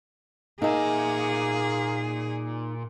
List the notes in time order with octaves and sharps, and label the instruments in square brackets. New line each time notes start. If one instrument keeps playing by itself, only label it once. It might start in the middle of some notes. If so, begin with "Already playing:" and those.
[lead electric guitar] A#2 G#5 [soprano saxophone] A#3 [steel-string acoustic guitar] D#4 E5 [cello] G#4